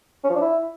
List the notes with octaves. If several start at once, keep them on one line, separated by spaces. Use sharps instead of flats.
C#4
F3
D4
E4